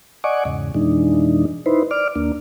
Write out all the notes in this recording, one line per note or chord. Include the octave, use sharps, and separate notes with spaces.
D5 D#5 F#5 G#5 C#6 D6
E2 G#2 C#3
F2 B2 E3 G#3 D4 D#4
D#4 E4 B4 C5
D5 D6 F6
D#2 A#3 D4